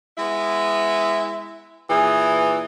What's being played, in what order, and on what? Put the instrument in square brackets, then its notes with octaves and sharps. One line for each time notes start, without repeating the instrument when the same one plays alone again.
[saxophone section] G#3 B3 E4
[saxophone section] A#2 E3 [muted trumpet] G#4